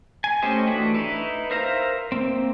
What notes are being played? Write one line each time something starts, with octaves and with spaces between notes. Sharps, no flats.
G#5
A3 C#4 G4 C5 D#5
E3 A3 D4 F#4 B4
D#4 E4 B4
A#4 C5 E5 F5 A#5
A#3 C4